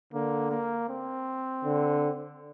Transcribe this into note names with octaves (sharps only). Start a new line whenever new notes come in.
D3 A#3
A#3
C4
D3